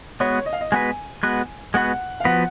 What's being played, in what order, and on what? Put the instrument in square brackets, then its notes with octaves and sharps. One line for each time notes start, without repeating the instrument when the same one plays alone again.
[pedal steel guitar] G#3 B3 F#4 B4 [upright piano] C#5
[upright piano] D#5
F5
D#5
[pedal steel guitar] G#3 B3 F#4 B4 [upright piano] G#5
[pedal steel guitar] G#3 B3 F#4 B4
[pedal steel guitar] G#3 B3 F#4 B4 [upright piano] F#5
[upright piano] F5
[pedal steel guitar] F3 B3 F#4 B4 [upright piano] F#5